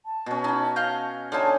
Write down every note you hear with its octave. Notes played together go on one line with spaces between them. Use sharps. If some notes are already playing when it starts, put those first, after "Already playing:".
A5
B2 C#4
D#4 E4
D#5 F5 G6
D3 D#4 F4 C#5 G#5 A5